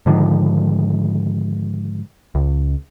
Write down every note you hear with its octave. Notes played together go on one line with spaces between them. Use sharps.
G#2 D3 D#3 F3
C#2